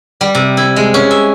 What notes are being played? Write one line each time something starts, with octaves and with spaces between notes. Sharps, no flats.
G3
C3
E4
G#3
C#4
E5